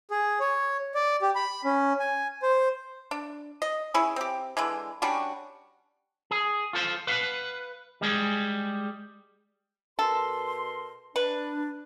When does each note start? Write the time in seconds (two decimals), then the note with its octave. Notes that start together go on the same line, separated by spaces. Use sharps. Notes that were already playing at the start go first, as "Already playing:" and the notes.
0.11 G#4
0.40 C#5
0.95 D5
1.22 G4
1.35 B5
1.65 C#4
2.00 G#5
2.42 C5
3.11 D4
3.62 D#5
3.94 C#4 E4 G#4
4.16 C4 G4
4.57 D3 E3 G#3
5.02 G3 C#4 D4 F#4
6.31 G#4
6.73 F4 A4 C5
7.07 B4 F5 F#5
8.01 G3 G#3 G#4
9.99 B2 A4 A#4 C6
11.16 D4 B4